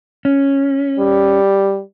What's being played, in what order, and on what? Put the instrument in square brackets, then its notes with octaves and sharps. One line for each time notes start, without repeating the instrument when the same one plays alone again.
[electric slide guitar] C#4
[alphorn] G3